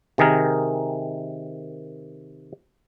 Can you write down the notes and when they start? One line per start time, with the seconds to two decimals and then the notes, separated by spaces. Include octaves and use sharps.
0.18 C3 D#3 G#4 A#4